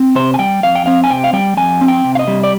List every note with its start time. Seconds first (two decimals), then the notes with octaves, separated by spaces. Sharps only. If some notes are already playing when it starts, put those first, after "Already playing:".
Already playing: C4
0.15 C3 C5
0.34 G#5
0.39 G3 G5
0.63 F2 F5
0.75 G5
0.86 C4 F5
1.04 G#5
1.10 C3 G5
1.24 F5
1.33 G3 G5
1.57 F2 G#5
1.81 C4
1.88 G5
2.04 C3
2.15 F5
2.19 D#5
2.27 G3
2.44 D5